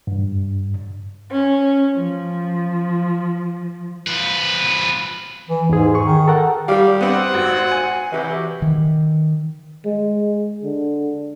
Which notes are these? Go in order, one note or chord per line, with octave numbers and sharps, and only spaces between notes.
G2
C#4
F3
F3 B4
E3
E2 G#2 G#4
G#4 C#6
D#3
A4 A#4 F#5
G3 F5
B3 C4 C5 F#5
G#1 F#4
G#5
C3 E3 F#4 G4
D#3
G#3
D3